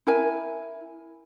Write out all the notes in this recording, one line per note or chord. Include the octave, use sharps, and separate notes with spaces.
E4 A#4 G#5